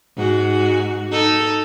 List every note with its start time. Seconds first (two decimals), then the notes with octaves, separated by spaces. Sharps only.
0.17 G#2 F#4
1.11 D#4 A4